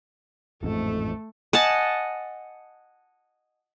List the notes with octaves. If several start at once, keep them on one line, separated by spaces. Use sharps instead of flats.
A1 F2 G#2 A3 A4
D#5 F#5 G#5 A5